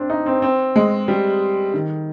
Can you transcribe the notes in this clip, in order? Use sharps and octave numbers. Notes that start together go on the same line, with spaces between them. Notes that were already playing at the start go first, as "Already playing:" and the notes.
Already playing: C4 D4
D#4
C4
C4
G#3
G3
D#3